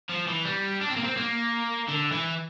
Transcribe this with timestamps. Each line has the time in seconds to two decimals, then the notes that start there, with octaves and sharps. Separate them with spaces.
0.09 F3
0.27 E3
0.45 G3
0.81 D4
0.89 C4
0.96 A#3
1.04 C4
1.17 A#3
1.88 D3
2.12 E3